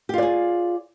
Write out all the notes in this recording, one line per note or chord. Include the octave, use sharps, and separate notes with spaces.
F4 G4 G#4 D5